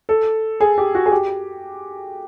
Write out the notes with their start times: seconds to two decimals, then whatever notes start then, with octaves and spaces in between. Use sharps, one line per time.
0.09 A4
0.60 G#4
0.78 G4
0.95 F#4
1.06 G#4
1.11 G4